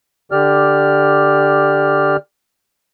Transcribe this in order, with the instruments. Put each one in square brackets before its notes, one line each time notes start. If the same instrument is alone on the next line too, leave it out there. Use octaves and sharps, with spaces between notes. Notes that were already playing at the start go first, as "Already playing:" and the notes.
[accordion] D3 G4 D5 F6